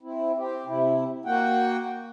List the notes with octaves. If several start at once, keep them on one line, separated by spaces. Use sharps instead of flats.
C4 E4
C4 G4
C3 E4
A#3 F#4 F#5 G5